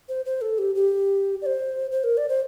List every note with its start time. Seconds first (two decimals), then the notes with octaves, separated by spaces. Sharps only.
0.09 C5
0.25 C5
0.41 A4
0.58 G4
0.75 G4
1.42 D5
1.46 C5
1.91 C5
2.04 A#4
2.17 D5
2.29 C5